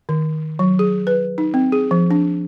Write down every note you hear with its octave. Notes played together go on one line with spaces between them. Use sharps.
D#3
F#3
G#4
B4
D#4
C4
G#4
F3
D4